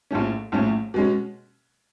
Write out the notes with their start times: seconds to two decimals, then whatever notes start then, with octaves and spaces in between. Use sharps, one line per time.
0.11 A#1 A2 F3 A3 C#4
0.52 A#1 A2 F3 A3 C#4
0.94 B2 G#3 C#4